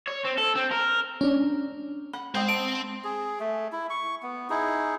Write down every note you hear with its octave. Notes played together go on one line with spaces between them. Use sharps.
C#5
C4
A4
C4
A#4
C#4 D4
F#5 B5
G#3 C4 C5 D#5 G5 G#5
A5 D7
G#4
A3
E4
C#6
B3
D#4 E4 G#4